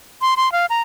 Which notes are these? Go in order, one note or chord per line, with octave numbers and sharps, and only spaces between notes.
C6
C6
F5
A#5